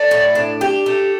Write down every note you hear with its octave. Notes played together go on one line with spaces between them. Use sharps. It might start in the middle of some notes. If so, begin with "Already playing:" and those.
Already playing: A3 D5
A2
D4
G4
A3